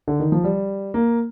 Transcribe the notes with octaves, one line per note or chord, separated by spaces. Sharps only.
D3
D#3
F3
G3
A#3